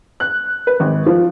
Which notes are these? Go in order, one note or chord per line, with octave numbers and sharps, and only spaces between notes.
F#6
B4
G#1
F3